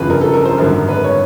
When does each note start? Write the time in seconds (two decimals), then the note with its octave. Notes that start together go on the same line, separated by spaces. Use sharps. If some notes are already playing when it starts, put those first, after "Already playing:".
Already playing: G1 F2 C#3 E3 B4
0.10 A#4
0.21 A4
0.34 A#4
0.45 C5
0.57 G#1 F#2 D3 A#4
0.89 B4
1.04 C#5